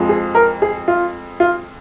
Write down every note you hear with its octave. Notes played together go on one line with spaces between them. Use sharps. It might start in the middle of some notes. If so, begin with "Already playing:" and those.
Already playing: F2 F3 G#3
G#4
A#4
G#4
F4
F4